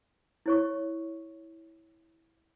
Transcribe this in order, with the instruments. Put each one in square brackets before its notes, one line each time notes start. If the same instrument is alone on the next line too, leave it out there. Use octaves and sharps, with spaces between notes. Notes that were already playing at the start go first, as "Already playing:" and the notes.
[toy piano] E4 C#5 C#6